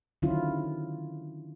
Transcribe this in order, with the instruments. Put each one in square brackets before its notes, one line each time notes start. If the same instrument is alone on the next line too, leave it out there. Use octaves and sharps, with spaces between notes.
[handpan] D3 D#3 F#3 C#4 E4 F4